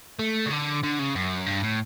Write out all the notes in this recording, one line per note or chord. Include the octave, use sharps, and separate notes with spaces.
A3
C#3
D3
D3
C#3
F#2
G2
A2